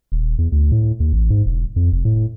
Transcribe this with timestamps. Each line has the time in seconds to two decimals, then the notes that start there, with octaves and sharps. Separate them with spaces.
0.12 D#1
0.38 E2
0.52 D2
0.72 A2
1.00 D#2
1.13 A1
1.30 G#2
1.46 E1
1.76 F2
1.92 F1
2.05 A2